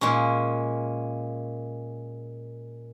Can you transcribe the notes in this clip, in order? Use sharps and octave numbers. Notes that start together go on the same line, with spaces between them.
A#2 G#3 C#4